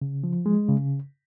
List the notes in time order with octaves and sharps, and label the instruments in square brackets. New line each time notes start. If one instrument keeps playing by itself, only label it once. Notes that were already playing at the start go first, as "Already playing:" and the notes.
[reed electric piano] C#3
F3
G#3
C#3